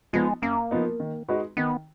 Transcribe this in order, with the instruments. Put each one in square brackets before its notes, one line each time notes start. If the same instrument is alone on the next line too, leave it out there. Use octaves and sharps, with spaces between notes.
[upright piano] F3 B3 D#4 [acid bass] G#3
[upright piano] F#2 [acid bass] A#3
[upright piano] F3 B3 D#4
D#3
G#3 D#4 F#4 B4
[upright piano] D#3 [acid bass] B3